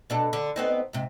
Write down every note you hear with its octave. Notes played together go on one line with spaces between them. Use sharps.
B2 D4 A4
D3
B3 C4 D#4
G#2 C3